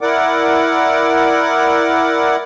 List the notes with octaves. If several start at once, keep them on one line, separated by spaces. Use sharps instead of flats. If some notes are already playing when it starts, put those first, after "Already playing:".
E4 A#4 D5 F#5 D6